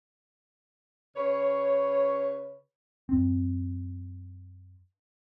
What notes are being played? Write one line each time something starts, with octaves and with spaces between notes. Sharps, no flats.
C#3 B4 C#5
F#2 C4